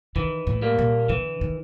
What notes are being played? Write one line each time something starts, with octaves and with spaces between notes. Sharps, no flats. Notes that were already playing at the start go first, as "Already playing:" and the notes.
D#3 E3
A2
G3 A#3
A#2
D3 E3
D#3